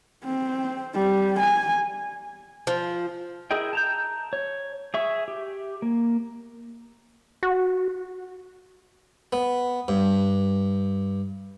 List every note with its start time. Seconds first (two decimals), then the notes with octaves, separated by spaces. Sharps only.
0.24 C4
0.95 G3
1.40 G#5
2.67 F3
3.51 E4 G#4 A#4 D#5 G5
3.73 A5 A#5 G6
4.33 C#5
4.94 G#4 E5 C#6
5.28 G4
5.82 A#3
7.43 F#4
9.33 B3
9.88 G2